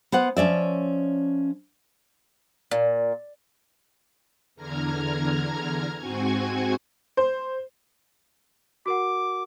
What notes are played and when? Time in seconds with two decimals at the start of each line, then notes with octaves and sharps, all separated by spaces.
0.12 B3 C5 F#5
0.37 F3 C#4 D5 E5
2.71 A#2
4.55 E2 D3 A#5 F6 G#6
5.98 G#2 C4 F#4 G#5 C#6 G#6
7.17 C5
8.86 F#4 A#4 F#5 D6